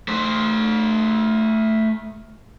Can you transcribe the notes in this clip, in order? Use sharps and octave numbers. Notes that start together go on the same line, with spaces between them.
A3 C5